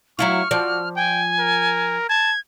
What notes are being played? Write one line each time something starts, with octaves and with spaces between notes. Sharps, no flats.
F#3 E4 F4 C#6 F6
F3 F#4 D5
G5 G#5
A#4
A5 G#6